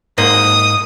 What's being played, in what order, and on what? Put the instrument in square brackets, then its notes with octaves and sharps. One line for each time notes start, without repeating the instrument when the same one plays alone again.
[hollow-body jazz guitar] G#2 A#3 [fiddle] D#6